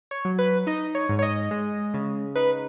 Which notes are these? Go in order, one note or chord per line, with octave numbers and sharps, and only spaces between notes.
C#5
F#3
B4
D#4 D#5
C#5
G#2
C#5
D#5
G#3
C#3
D#4 B4